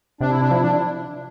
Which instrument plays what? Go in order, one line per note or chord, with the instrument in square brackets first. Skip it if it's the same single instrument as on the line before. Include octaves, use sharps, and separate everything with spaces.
[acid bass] C3 [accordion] D4
[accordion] E4
D4
[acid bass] F3 [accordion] E4
[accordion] D4